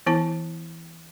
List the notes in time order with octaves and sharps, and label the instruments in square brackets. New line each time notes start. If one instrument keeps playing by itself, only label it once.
[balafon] E3 B3 E4 A5